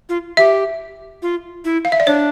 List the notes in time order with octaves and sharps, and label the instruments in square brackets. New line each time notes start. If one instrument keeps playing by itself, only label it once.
[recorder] F4
[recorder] G4 [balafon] E5
[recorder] F4
E4
[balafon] F5
E5
D5
[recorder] D4 [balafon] C#5